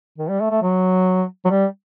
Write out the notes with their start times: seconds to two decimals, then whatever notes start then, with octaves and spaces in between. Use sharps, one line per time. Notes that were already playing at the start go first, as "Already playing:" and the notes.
0.18 D#3
0.29 G3
0.41 A3
0.51 A3
0.62 F#3
1.45 F#3
1.50 G3